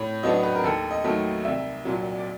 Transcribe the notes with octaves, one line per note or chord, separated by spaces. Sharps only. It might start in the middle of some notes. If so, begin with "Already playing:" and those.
Already playing: A2 C#5
F#3 B3 D4 D#5
B4
A#4
D#2 A4
D#5
D#3 F#3 A3
C2 E5
A#2 F#3
D5